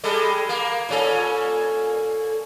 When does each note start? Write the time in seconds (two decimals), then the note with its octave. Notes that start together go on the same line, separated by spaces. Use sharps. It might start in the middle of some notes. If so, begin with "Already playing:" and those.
0.04 G3 G#3 A4
0.49 A#3
0.89 A#2 C#4 A4